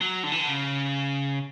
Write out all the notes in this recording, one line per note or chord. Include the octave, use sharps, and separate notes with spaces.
F#3
D3
E3
D3
C#3